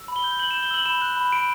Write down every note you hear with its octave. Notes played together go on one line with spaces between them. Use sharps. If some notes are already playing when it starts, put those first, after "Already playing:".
Already playing: E6
B5
G7
G6
G6 F#7
G6 E7
G7
E6 F#7
B5 E7
F#6
B5
B5 D7